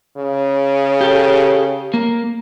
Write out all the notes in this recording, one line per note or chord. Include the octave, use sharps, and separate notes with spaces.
C#3
G4 A4
A#3